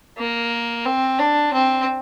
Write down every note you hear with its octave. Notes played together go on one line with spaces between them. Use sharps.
A#3
C4
D4
C4